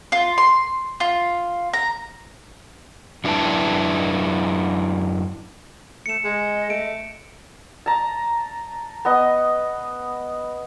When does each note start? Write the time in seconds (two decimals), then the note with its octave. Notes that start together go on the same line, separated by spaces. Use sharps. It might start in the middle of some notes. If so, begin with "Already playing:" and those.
0.12 F4
0.38 C6
1.00 F4
1.73 A#5
3.24 F#2 D4 E4 B4 G5 A5
6.06 A3 C#7 E7
6.24 G#3 D#5
6.70 A3 D7
7.86 A5 A#5
9.05 B3 D#5